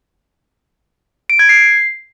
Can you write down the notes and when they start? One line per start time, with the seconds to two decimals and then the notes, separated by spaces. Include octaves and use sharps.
1.30 D7
1.39 G#6
1.49 C7